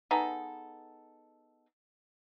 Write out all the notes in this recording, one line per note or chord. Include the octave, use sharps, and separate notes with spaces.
B3 D#4 G#4 A4